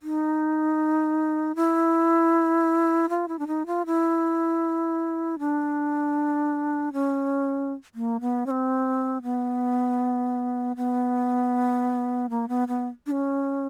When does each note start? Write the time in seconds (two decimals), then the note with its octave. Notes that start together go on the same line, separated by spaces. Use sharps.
0.02 D#4
1.56 E4
3.09 F4
3.28 E4
3.39 D4
3.47 D#4
3.66 F4
3.86 E4
5.39 D4
6.93 C#4
7.95 A#3
8.21 B3
8.46 C#4
8.51 C4
9.23 B3
10.76 B3
12.30 A#3
12.48 B3
12.68 B3
13.06 D4
13.11 C#4